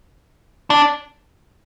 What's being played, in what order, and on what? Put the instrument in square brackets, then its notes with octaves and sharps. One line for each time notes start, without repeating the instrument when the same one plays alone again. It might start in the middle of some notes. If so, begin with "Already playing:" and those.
[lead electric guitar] D4